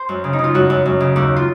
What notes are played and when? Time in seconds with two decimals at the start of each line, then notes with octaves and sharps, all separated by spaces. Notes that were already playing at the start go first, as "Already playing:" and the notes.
Already playing: C5
0.09 F#2
0.24 C#3
0.33 D#4
0.39 C#3
0.44 F4
0.54 F#2 F#4
0.70 F#2
0.86 F#2
1.00 C#3
1.16 D#2
1.36 F4